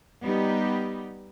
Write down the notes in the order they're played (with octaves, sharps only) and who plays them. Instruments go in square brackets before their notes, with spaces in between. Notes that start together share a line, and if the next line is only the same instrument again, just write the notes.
[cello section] G3 B3 D#4 G4